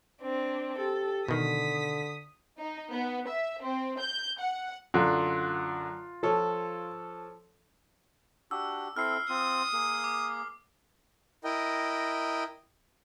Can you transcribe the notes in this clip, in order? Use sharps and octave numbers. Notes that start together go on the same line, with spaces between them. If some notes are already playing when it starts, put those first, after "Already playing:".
C4 D4
G4 A4
B2 D3 D#3 D#6 B6
D#4
B3
E5
C4
G6
F#5
F#2 D3 F4
F3 A4 C#5
D4 F#4 G4 E6
C4 E4 A4 F6 C7
C4 F4 D#6
A#3 G#4
D6
E4 A#4 D#5 G5